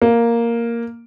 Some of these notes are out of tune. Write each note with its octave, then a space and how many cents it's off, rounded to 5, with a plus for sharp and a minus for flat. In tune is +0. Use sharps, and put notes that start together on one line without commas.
A#3 +0